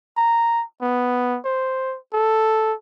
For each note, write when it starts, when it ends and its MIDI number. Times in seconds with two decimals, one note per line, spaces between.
0.17 0.64 82
0.81 1.38 59
1.45 1.96 72
2.13 2.73 69